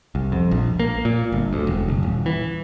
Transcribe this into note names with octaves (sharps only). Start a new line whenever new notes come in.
C2
F2
A#1
A#3
A#2
G1
D2
E1
F#1
D#1
E3